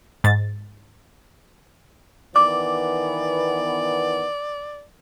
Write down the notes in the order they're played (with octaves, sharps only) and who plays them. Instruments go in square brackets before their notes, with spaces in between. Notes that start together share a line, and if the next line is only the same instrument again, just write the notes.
[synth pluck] G#2 A6
[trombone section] D#3 E3 B3 [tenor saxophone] D5 [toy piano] D6